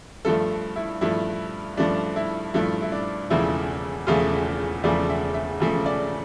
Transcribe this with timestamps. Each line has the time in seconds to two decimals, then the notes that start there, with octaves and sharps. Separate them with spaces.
0.25 G2 F3 A3 A4
0.76 E4
1.01 G2 F3 A3 E4
1.77 G2 F3 A3 D4
2.16 E4
2.54 G2 F3 A3 E4
2.82 E4
2.92 D4
3.30 E1 E2 C#3 F3 A3 E4
4.07 E1 E2 C#3 F3 A3 F4
4.83 E1 E2 C#3 F3 A3 D5
5.10 E5
5.34 E5
5.60 E1 E2 C#3 F3 A3
5.86 D5